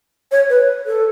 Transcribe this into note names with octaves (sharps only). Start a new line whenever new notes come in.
C#5
B4
A4